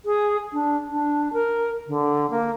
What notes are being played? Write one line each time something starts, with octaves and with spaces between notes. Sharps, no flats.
G#4
D4
D4
A#4
D3
A#3